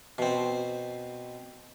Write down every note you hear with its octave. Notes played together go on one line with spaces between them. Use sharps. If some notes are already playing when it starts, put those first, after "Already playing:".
B2 C4